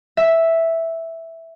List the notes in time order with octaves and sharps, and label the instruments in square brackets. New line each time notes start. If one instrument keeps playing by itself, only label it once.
[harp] E5